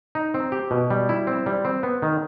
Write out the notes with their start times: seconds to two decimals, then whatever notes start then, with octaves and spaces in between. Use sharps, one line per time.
0.15 D#4
0.34 C4
0.52 G4
0.71 B2
0.90 G3
1.09 E4
1.27 C4
1.46 G3
1.65 C4
1.83 B3
2.02 D#3